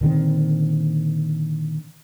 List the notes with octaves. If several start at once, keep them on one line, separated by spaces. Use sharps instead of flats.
A#2 D3 D#3 C4